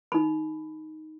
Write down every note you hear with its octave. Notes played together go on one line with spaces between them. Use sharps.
D#4 B5